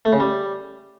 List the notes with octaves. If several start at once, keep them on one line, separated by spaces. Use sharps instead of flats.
A3
C#3
G3